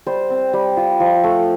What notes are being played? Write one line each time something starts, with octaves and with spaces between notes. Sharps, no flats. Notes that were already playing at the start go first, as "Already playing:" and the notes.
G3 C5
C4
G3
F4
F3
A3